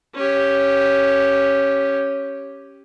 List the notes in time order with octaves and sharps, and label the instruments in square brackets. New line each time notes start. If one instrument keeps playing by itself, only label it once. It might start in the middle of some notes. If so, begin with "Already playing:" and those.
[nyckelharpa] C#4 G4